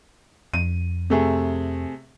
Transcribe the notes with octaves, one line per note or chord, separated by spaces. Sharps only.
F2 D#7
C3 A3 G#4